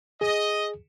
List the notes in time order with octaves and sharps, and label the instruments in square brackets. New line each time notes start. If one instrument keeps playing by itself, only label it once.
[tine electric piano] G#4 [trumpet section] D#5